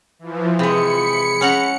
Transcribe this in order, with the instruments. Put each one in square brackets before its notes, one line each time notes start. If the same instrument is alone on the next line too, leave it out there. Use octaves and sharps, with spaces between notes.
[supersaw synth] E3 F3
[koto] C3 G#3 [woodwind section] G#4 B5 [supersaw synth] C#7
[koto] C#4 F#5 A#5